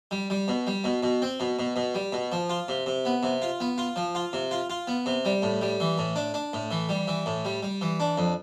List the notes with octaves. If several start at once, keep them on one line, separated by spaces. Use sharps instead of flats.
G3
G3
B2
G3
B2
B2
C4
B2
B2
B2
G3
B2
F3
F4
C3
C3
B3
C3
F4
B3
F4
F3
F4
C3
F4
F4
B3
C3
G3
A2
G3
E3
A2
D4
D4
A2
E3
G3
E3
A2
G3
G3
E3
D4
F2